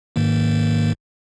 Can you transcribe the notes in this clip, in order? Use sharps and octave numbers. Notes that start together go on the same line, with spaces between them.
G#2 D#3 A#3